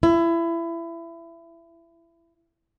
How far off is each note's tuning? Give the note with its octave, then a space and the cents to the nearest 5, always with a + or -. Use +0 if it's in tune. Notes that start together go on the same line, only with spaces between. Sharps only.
E4 +25